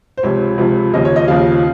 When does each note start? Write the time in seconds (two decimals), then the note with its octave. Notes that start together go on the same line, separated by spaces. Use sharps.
0.17 C5
0.23 C#2 C3 F3 C#5
0.58 C#2 C3 F3
0.94 D#2 C#3 F3 D#5
1.05 C#5
1.16 D#5
1.28 D#2 C#3 F3 F5